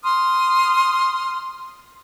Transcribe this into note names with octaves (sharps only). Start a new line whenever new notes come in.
C6 D#6 F6